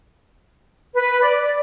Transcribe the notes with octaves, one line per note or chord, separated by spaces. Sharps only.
B4
D5
D5